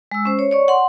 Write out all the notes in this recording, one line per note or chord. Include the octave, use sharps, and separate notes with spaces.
G#3 E6
C#4 C5
C#5
C#5 D5 C#6
F#5 C6